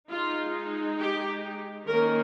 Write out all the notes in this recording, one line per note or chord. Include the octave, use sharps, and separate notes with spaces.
G#3 D#4 F4
G4
D#3 A#3 C#4 A#4